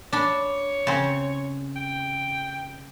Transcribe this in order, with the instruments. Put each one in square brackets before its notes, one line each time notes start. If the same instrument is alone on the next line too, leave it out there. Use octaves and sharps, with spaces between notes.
[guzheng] D4 B5 [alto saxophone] C#5
[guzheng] C#3 C4
[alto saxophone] G5